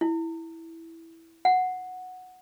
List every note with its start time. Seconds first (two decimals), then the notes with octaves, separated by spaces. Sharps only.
0.01 E4
1.45 F#5